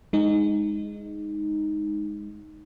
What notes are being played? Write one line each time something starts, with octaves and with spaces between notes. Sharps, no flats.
G#3 D#4